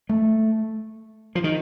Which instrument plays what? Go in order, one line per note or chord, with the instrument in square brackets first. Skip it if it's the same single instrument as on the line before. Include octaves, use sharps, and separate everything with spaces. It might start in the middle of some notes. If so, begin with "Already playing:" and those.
[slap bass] A3
F3
D#3